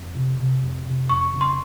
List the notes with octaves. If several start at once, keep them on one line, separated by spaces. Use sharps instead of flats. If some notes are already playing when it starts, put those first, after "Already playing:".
Already playing: F2
C3
C3
F2
C3
F2 C#6
C#3
C6